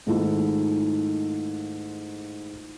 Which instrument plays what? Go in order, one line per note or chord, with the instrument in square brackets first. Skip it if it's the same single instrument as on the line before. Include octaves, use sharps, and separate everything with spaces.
[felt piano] G#2 D#3 A3 A#3 E4 F4